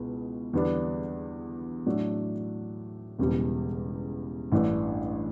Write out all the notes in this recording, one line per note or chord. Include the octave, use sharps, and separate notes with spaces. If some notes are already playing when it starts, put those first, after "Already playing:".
Already playing: C#2 B2 E4
E2 D3 G3 B3 D4
A2 F#3 A3 D4 F#4
E1 E2 C#3 G3
A1 G2 E3 A3 D4